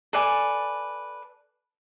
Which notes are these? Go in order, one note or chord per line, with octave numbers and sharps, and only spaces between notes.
A4 B4 D5 G#5